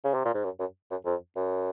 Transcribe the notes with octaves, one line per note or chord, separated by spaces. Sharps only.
C#3
C3
A#2
G#2
F#2
F#2
F#2
F2
F#2